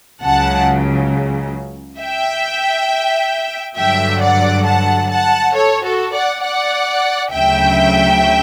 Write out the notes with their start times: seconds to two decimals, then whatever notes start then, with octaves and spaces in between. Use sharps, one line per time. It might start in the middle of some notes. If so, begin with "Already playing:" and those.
0.22 C#2 C#3 F#3 F#5 A5
1.99 E5 G5
3.78 G2 D3 F#3 E5 G5
4.22 D5 F#5
4.66 F#5 A5
5.11 F#5 A5
5.54 A4 C#5
5.84 F#4 A4
6.14 D5 F#5
6.43 D5 F#5
7.33 D2 C#3 F#3 E5 G5